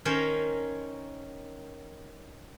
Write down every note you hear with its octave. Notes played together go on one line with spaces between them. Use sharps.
D#3 C#4 A#4 C5 C#5